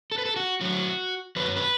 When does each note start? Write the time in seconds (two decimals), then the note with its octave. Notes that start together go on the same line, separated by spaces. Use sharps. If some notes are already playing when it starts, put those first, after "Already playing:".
0.12 A4
0.18 B4
0.25 A4
0.36 F#4
0.61 A2 F#3 F#4
1.36 F#2 F#3 B4
1.56 B4